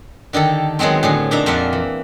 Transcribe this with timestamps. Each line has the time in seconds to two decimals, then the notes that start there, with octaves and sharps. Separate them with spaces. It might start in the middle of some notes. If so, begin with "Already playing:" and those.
0.33 D3 D#3 G4 A4
0.79 D#3 F#3 G#3 B3 C4
1.03 A2 D3 G#4
1.31 A#2 D4 D#4 E5 A#5
1.46 F2 A#3 F4 E5 F#5
1.73 E3